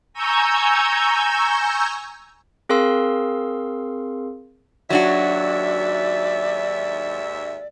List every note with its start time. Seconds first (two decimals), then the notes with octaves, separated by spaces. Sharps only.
0.13 G#5 A#5 C#6 E6 G6 G#6
2.69 C4 G#4 A#4 F5 C6 E6
4.90 D#2 G#2 F#3 D4 F#4 D5 E5